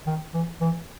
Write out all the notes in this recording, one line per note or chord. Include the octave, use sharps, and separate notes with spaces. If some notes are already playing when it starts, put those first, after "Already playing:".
D#3
E3
E3